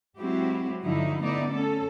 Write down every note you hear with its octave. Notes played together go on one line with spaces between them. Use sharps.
F#3 G#3 C4 E4 F#4 G4
G2 D3 F3 F#3 D#4 E4
D3 A3 B3 D#4 E4 D5
C#4 A4